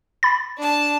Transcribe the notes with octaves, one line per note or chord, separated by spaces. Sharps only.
B5 A6
D4 A5